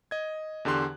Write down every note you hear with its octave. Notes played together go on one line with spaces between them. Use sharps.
D#5 G#6
E2 D3 G4 C6 F#6